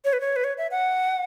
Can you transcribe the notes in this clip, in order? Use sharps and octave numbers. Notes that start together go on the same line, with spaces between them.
C#5
B4
C#5
B4
C#5
E5
F#5